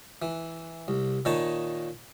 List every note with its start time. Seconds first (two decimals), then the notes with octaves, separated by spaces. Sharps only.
0.22 E3
0.88 C2
1.25 A#2 D#3 D#4 C#5 D#5 A5